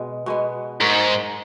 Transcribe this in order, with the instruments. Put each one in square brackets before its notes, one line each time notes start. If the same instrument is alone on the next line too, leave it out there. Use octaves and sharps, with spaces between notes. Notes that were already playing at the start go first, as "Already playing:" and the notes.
Already playing: [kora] B2 G#3 B3
B2 G#3 B3
[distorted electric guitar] G#2 [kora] G#3 D#4 A#4 C#5